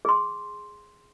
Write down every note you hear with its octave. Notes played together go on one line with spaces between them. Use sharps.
G#4 C6